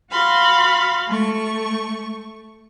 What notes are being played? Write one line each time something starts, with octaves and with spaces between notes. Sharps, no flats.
F#4 F5 B5 C6
A3 C#6